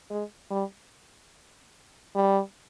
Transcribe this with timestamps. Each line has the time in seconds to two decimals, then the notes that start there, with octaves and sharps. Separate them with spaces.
0.10 G#3
0.51 G3
2.15 G3